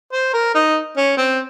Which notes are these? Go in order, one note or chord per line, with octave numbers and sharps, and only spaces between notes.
C5
A#4
D#4
C#4
C4